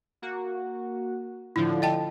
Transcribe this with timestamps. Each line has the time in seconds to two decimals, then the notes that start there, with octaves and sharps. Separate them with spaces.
0.22 A#3 F#4
1.56 A2 D3 F3 E4
1.82 D#5 G5 A5